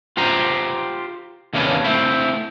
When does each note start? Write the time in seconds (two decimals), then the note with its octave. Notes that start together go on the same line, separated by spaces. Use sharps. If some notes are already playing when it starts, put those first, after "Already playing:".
0.17 F4 G4 C5 A#5
1.53 D#2 C3 A#3 C#4 D4 B4
1.84 A3 C4 E4